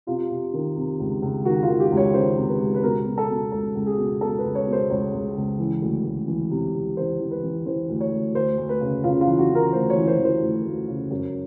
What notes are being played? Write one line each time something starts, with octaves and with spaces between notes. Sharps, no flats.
C3 F4
C3
D#3
C3
C#2
C#2
D#3 F#4
F4
D#3
G4
C#2
C#5
D#3 C5
C3
B4
C#2
B4
B2 A#4
B2
A4
B2
C#2 A4
C#2
G#4
B2
B2 A4
B4
C#2
C#5
B2
C5
C#2 C#5
C#2
C#2
E3
D2
D2
E3
C3
C3
E3 C5
E3
B4
E3
E3 C5
D2
C#5
D2
D2 C5
D2
B4
C#3
C#3 F4
F4
E3
F#4
E3
A#4
D2 C5
C#5
E3
C5
E3
C5
D2
D2
C#3
F#2